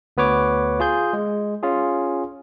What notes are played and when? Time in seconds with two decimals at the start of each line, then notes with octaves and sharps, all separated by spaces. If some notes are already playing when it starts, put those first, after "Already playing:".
0.17 D2 B3 B4 C#5 D6
0.80 F4 G#4 G6
1.13 G#3
1.63 C#4 F4 G#4